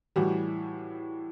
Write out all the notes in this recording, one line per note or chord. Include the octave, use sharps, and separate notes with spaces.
A2 E3 G3 F#4